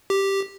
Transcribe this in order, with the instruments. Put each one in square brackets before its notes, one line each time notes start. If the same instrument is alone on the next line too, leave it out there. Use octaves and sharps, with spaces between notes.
[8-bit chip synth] G4